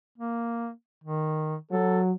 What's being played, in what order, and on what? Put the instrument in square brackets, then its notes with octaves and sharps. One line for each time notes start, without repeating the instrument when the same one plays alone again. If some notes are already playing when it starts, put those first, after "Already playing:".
[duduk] A#3
D#3
[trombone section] F#3 [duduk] A4